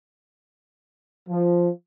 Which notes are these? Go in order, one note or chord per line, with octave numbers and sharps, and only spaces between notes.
F3